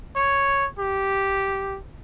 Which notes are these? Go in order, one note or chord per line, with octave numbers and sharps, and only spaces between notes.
C#5
G4